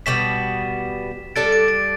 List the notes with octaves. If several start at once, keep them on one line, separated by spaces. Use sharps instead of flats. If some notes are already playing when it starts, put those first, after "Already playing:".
B2 G3 B3 B6 E7
G3 D4 A4 A6 D7
A6 D7
A6 D7